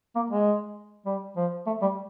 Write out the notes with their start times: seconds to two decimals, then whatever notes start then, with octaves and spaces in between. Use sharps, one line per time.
0.16 A#3
0.30 G#3
1.06 G3
1.37 F3
1.67 A3
1.82 G3